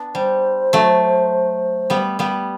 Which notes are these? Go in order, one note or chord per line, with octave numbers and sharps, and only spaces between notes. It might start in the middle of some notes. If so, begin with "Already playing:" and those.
Already playing: B3 D4
G3 C5
F#3 A3
G3 B3
G3 B3